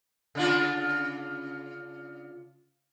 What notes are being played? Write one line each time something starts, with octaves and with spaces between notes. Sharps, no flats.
C#3 D4 F4